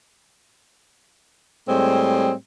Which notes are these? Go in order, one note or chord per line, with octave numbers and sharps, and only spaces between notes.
A2 G3 G#3 C4